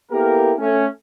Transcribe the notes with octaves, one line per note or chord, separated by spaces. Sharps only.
A#3 B3 E4 G4 A4 A#4
A3 C#4